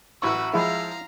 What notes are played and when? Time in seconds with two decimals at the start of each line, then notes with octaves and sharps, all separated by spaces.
0.22 A1 E4 F#4 B4 C#6 E6
0.54 F3 G#3 E4 F5 A#5